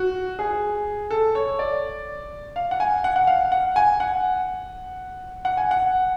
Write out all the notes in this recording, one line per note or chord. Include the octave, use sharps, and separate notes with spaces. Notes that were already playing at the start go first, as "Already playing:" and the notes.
Already playing: F#4
G#4
A4
C#5
D5
F5
F#5
G#5
F#5
F#5
F5
F#5
G#5
F#5
F#5
G#5
F#5